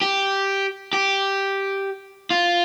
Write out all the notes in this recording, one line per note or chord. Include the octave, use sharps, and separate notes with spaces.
G4
G4
F4